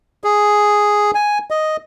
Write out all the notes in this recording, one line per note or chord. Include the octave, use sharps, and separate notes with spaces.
G#4
G#5
D#5